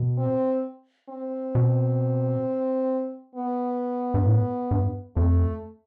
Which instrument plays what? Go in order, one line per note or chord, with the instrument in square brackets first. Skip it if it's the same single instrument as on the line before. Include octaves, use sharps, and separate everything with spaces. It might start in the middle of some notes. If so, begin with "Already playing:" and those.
Already playing: [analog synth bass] B2
[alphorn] C4
C4
[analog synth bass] B2
[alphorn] B3
[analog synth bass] G2
A2
G2
[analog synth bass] F2 [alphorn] A3